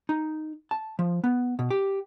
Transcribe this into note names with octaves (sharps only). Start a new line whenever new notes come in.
D#4
A5
F3
B3
B2
G4